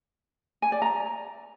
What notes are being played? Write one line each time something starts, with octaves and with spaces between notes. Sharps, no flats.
G#5
D5
A#5